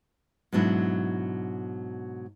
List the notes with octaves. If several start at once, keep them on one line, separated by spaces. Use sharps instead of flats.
G#2 B2 F#3 D4 E4